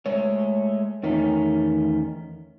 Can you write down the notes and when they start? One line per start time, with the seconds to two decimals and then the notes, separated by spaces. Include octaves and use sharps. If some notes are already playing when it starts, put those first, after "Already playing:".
0.06 G#3 A3 C#5
1.03 E2 D#3 A3 C#4 D#4